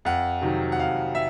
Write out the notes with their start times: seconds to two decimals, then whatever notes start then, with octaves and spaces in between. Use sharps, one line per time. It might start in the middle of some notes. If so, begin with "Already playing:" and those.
0.05 F2 F#5
0.42 C3 D#3 F#3
0.72 F#5
0.79 F2 F5
1.15 E5